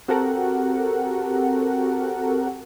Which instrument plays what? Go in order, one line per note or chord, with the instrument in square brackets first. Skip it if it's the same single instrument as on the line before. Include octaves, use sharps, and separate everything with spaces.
[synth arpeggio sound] C4 F#4 G4 A4 A#4 F#5